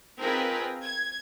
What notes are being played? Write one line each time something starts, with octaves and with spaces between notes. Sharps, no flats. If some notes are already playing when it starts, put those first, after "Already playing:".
C4 D#4 F4 G#4 A#4 B4
G#6